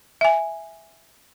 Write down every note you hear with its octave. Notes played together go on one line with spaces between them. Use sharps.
E5 G#5